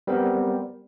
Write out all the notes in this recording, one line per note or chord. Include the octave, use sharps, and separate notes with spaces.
G3 B3 C4 A#4